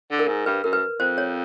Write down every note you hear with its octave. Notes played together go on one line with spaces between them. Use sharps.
D3
A#4
G#2
G2 B4
F#2 A#4
B4
F2 C5
C#5